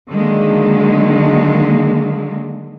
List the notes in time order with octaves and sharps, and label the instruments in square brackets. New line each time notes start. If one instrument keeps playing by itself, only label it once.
[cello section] D3 D#3 F#3 G#3 A#3